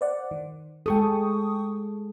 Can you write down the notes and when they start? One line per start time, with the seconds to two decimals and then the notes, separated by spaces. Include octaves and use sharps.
0.01 C5 D5 F#5
0.31 D#3
0.86 G#3 G#4 A4 G5 C#6 D#6